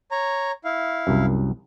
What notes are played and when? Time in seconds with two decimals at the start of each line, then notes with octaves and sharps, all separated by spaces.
0.11 C#5 A#5
0.65 E4 F5
1.07 C2 F#2